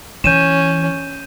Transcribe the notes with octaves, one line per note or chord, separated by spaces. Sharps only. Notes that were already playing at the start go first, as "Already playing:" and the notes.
E3 C#4 G6 D#7 E7